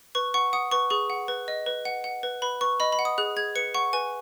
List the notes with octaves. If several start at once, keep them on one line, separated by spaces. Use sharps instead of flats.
B4 C#6
F#5 C#6
F#5 D#6
B4 C#6
G#4 C#6
F#5
B4
D#5
B4
F#5
F#5
B4
B4 B5
B4 C#6
D#5 B5
B5
F#5
D#6
G#4 F#6
G#4 G#6
B4 C#7
F#5 C#6
B4 G#5